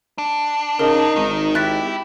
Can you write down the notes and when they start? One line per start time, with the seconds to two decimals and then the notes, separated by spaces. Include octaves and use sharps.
0.18 D4
0.79 C#3 D#4 A#4
1.16 G#1 D#3
1.55 E4 G4 F#6 A6 B6